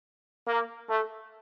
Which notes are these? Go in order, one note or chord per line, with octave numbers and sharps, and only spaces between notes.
A#3
A3